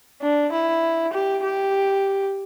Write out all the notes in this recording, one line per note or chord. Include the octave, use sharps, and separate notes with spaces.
D4
E4
G4
G4